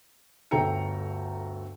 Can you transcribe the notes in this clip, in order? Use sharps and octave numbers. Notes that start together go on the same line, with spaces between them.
G1 D2 A4 G5 A#5 C#7